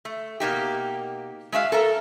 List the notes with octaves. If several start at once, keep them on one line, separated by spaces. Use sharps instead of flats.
A3
B2 A#3 D#4 G4
G#3 F#4 E5 F5
A4 A#4 E5